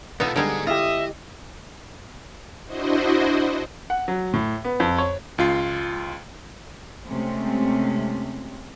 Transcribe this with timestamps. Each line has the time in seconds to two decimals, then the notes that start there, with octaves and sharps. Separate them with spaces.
0.20 B2 B3 D#4 F4 A4 E5
0.36 D3 G3 G#3 D#4 G#4
0.67 E4 F4 G4 D#5 E5
2.66 D4 E4 F#4 C5 D#5
3.90 F#5
4.08 F#3
4.33 A2
4.65 B3
4.80 F2
4.98 C#5
5.38 C#2 F4 C7
7.07 C3 G#3 A3 C4 C#4